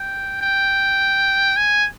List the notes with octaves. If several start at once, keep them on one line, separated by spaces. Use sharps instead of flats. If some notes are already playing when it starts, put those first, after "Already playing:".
Already playing: G5
G5
G#5